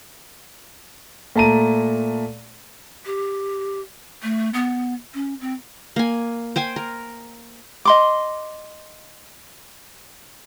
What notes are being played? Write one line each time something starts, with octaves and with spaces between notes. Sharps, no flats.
A#2 A3 A5 A#5 D#7
G4
A3
B3
C#4
C4
A#3 G#5
C5 G5 G#5
A#4
D#5 C6 D6